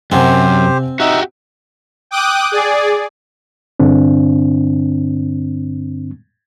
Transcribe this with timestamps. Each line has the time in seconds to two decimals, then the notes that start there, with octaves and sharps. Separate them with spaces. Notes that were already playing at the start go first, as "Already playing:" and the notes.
0.12 F#2 C3 C4 G4 C5 F#5 G#5
1.00 D#4 F#4 G4 E5
2.11 G5 D6 D#6 F#6
2.52 G#4 D5
3.80 G2 D3 C4 D4